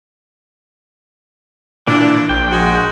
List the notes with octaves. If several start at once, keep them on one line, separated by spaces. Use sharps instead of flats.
A#2 E3 D4 E4
A#1 G5
G#3 F#4